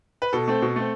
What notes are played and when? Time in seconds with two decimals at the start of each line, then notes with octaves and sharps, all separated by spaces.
0.22 B4
0.33 B2 A4
0.48 A3 C4
0.62 B2
0.76 A3 C4